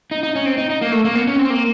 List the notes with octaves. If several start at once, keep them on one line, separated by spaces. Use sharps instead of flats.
D#4
D#4
C#4
C4
D#4
D#4
A#3
A3
A#3
B3
C#4
C4
A#3